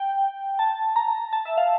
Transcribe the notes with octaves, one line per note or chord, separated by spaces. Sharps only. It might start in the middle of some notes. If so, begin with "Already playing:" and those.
Already playing: G5
A5
A#5
A5
E5
F5